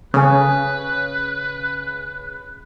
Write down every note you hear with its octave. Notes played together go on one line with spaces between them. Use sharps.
C#3 A4 B4 F5 G#5